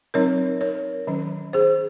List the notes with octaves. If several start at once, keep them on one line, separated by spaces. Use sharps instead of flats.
F#3 C4 D#4 A#4 C#5
A#4 C#5
D#3 F#3 C#4
G#4 C5